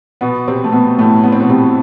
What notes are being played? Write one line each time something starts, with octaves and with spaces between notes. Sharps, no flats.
B2 B3
C3 C4
A3
B2 B3
A2 A3
B3
C4
B2 B3
C3 C4